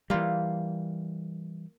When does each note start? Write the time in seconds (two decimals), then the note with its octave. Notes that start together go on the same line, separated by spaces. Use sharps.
0.10 E3 G3 A#3 F4